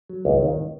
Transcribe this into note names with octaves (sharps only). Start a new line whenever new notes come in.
F#3
C#2
D#3